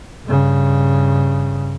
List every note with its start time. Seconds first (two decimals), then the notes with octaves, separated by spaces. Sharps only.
0.24 G2 C#3